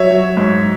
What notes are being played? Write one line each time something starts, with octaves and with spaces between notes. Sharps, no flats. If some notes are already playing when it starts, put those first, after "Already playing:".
Already playing: F#3 C#5 E5
F#3
G#2